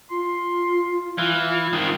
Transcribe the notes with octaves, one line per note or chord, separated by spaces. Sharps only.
F4 C6
E3 F5
D#3 C4